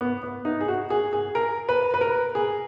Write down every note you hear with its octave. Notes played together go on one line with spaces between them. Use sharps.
B3
B3
D#4
G#4
F#4
G#4
G#4
A#4
B4
B4
A#4
G#4